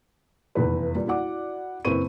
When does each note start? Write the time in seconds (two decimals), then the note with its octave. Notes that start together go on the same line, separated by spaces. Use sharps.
0.55 F1 E2 B4
0.95 A#2 G3
1.07 E4 F#4 D5 F#5 D6
1.85 F#1 C4 E4 B4 C#6 D#7